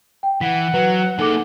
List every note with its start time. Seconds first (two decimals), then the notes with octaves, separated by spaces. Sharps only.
0.23 G5
0.41 E3 F#5 B6
0.74 F#3 B4
1.18 A#3 D#4 G#4 A4 D6